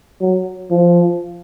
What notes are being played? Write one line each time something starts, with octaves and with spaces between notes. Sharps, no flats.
F#3
F3